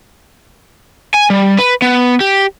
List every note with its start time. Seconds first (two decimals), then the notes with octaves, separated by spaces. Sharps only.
1.14 G#5
1.30 G3
1.59 B4
1.82 B3
2.21 G4